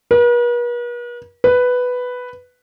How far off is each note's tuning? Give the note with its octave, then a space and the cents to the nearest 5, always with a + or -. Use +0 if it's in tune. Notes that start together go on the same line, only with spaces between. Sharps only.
B4 -45
B4 +5